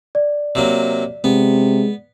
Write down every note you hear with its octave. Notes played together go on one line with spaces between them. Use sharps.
D5
C3 F#3 A#3
C3 G#3 B3